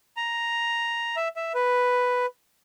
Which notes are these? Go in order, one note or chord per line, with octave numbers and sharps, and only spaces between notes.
A#5
E5
E5
B4